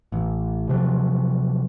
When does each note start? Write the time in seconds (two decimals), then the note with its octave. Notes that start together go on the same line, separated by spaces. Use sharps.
0.12 A1
0.69 C3 F3 F#3